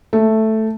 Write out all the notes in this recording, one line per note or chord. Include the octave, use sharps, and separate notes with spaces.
A3